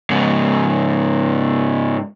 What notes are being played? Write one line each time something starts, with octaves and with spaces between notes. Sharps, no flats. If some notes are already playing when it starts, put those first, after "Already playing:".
G#2 C#3